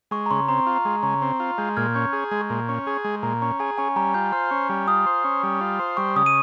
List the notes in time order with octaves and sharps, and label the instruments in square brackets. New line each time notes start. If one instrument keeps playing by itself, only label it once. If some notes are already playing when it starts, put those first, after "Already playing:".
[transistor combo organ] G#3 [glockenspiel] C#6
[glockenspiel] A#5
[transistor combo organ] C#3 [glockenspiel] C6
[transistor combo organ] C4 [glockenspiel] A#5
[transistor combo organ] F4
[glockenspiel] A#5
[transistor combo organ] G#3
[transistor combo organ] C#3 [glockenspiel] A#5
[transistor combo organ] C4
F4
[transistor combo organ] G#3 [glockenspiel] G6
[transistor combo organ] A#2 [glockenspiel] F6 G#6
[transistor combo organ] C#4 [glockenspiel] G6
[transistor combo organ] G#4 [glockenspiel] F6
[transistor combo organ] G#3 [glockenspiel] C6
[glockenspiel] C#6
[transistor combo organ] A#2
C#4
G#4
G#3
[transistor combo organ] A#2 [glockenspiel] A#5
[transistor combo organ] C#4 [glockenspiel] A#5
[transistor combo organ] G#4 [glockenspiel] G#5
[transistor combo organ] C#4 [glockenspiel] G#5
[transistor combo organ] G3 [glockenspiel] A#5
[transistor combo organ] F4 [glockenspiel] G6
[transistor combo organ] C5 [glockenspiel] F6
[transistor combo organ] C#4
G3
[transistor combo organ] F4 [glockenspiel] D#6
[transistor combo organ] C5
C#4
G3
F4
C5
[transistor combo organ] G3 [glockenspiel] C#6
[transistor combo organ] C#3 [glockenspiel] D#6
[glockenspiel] D#7